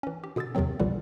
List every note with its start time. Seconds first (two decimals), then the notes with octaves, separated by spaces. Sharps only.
0.03 E3 C#4
0.24 G4
0.36 B2 D3 D#6 E6 A6
0.55 E2 C3 D#3 F#3 C4
0.80 A#1 A#2 D3 E3 G3